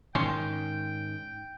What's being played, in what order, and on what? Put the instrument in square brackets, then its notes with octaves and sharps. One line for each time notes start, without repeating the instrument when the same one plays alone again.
[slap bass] G#2 D#3 [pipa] C#4 C#5 C6 [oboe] G5